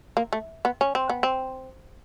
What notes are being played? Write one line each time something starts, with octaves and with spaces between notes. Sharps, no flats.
A#3
A3
B3
C#4
C4
B3
C4